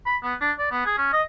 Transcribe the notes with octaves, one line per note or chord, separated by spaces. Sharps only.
B5
B3
D4
D5
B3
G#4
C#4
D#5